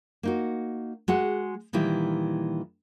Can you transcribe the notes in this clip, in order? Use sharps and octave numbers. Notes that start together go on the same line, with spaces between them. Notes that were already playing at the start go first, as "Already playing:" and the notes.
A#3 D#4 F#4
G#3 F#4 F#5
A#2 D#3 E3 G3 E4